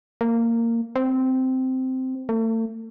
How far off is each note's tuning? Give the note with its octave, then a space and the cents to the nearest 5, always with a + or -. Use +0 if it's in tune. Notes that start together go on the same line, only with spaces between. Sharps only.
A#3 -15
C4 -10
A3 +40